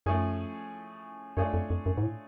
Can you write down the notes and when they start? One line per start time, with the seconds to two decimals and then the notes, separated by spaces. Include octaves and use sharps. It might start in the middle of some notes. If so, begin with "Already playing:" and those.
0.06 F#2 F3 A3 C#4 G#4
1.37 F#2 A3 D4 F4 G#4 C#5
1.54 F2
1.70 F2
1.86 F#2
1.97 G#2
2.02 A2